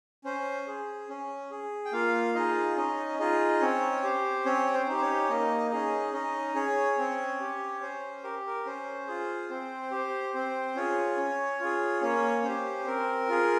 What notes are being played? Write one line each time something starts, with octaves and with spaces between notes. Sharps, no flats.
C#4 C5
G#4
C#4
G#4
G5
A#3 F4 F5
D#4 F4 G#4 D#5
C#4 D#4 D#5
D#4 F4 G#4 D#5
C4 C#4 C#5
G4 C5
C4 C#4 C#5
C5
D#4 G4
C5
C#4 C#5
A#3 D#4 D#5
C#4 D#4 G#4 D#5
C#4 D#4 D#5
C#4 G#4 C#5
C4
G4
C#4 C5
G4 A#4
A#4
C#4 C5
F4 G#4
C4 C5
G4 C5
C4 C5
C#4 F4 G#4 C#5
C#4
F4 G#4
A#3 C#4 C#5
C#4 G4 C5
C4 A#4
F4 G#4